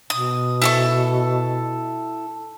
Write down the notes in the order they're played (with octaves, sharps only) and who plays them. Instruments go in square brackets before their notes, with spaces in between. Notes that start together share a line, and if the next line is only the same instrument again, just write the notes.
[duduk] B2 [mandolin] D#6
[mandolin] E4 A4 C#6